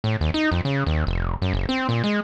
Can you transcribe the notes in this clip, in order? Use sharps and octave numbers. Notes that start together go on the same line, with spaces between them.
A2
D#2
D#4
F2
C#3
D#2
F1
F#2
F#1
C4
A#2
G#3